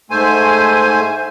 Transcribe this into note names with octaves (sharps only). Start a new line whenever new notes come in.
G#2 A3 C5 G#5